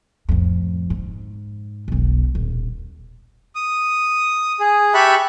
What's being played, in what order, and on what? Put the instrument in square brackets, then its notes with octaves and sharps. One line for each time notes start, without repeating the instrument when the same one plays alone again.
[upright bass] F2 A2
G#2
E1 B1
D#1
[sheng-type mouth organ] D#6
G#4
G4 E5 A5 B5 C#6 F#6